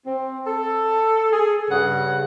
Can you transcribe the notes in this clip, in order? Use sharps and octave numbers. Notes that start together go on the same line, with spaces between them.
C4
A4
G#4
G2 C#3 F#5